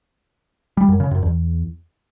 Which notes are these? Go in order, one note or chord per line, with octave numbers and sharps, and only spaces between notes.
G3
F#2
C#3
F#2
E2